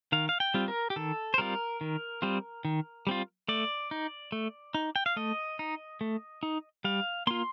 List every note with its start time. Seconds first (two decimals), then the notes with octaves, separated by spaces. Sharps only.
0.12 D#3 F5
0.29 F5
0.40 G5
0.54 G3 C4 F4
0.68 A#4
0.90 G4
0.96 D#3 A4
1.34 C5
1.38 G3 C4 F4 A#4
1.81 D#3
2.22 G3 C4 F4
2.65 D#3
3.07 G3 C4 F4
3.48 A3 D5
3.91 D#4
4.32 A3
4.75 D#4
4.96 G5
5.06 F5
5.16 A3 D#5
5.59 D#4
6.01 A3
6.43 D#4
6.84 G3 F5
7.27 A#3 F4 C6